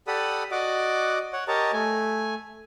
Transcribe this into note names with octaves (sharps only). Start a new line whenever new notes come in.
G4 A4 D5 F#5 B5 D#6
F#4 D5 D#5 F#5 D6
C#5 F#5
G4 A#4 C#5 D#5 A5 A#5
A3 G#5